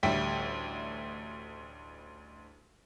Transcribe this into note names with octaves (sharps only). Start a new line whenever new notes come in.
A1 D2 G3 E5 G5 B6